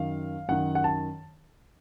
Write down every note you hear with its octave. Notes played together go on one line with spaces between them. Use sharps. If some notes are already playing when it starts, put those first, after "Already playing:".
Already playing: F#2 D#3 F5
F#2 D#3 F#5
F#5
A5